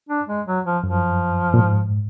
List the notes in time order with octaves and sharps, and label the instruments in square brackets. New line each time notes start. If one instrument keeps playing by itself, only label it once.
[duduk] D4
G#3
F#3
F3
[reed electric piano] F#2 [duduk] F3
[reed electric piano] A#2
G#2